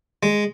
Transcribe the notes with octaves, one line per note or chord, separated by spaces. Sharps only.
G#3